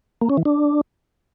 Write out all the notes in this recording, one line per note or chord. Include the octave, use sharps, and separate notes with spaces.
A#3
C#4
E3
D4